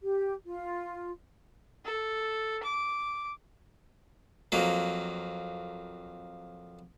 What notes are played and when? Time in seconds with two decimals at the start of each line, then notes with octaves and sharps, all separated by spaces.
0.02 G4
0.45 F4
1.85 A4
2.63 D6
4.52 F2 F#3 A#3